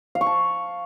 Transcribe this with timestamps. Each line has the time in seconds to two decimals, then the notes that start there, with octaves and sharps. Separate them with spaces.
0.15 F5
0.21 C#6
0.27 A5